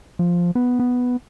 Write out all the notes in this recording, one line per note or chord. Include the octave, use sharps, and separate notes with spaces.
F3
B3
B3